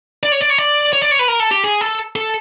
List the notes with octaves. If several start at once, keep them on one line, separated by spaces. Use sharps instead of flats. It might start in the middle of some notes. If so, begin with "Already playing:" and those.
D5
C#5
D5
C#5
D5
C#5
D5
C#5
B4
A#4
A4
G4
G#4
A4
A4